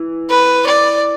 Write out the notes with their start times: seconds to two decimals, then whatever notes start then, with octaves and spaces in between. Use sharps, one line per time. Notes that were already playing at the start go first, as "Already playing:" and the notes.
Already playing: E3
0.29 B4
0.66 D5